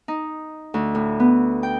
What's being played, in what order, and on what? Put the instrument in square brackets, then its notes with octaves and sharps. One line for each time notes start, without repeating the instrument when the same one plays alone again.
[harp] D#4
D2
A2
B3
G5